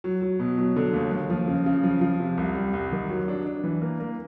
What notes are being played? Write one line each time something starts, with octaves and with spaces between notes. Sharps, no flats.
F#3
F#3
B2
F#3
D3
D#2
D#2
F3
C#3
C#3
F3
F3
C3
C2
G3
C2
D#3
F#3
D4
D4
E3
A#3
A#3